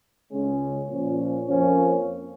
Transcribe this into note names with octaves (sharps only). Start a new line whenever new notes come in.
C#2 C#3 G#3 C#4
A#2 F3 C#4
F2 F3 A#3 C#4